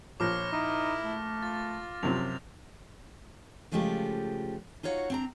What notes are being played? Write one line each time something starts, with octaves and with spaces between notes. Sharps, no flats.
A#1 F3 C#5 D6 F6 A#6
D#4 E4
A3
F4 A6
F#2 C3 F3 C4 F7
C#3 F3 G#3 A3 F4 G4
D#4 F4 F#4 C#5 F#5
C4 D4 A#5